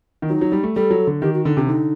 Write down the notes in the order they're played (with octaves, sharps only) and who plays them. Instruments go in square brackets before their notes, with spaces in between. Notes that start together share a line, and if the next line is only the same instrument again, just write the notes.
[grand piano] D#3
[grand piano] F#3 [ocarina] D#4
[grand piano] F#3
G3
A3
[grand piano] G3 [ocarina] A4
[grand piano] F#3
D3
[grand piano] D#3 [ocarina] G4
[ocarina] F#4
[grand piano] D3 [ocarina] D#4
[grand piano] C3 [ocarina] D4
[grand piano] D3 [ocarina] D#4